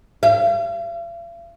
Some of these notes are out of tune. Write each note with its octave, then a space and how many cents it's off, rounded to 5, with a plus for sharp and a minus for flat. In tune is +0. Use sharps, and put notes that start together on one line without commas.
F5 -45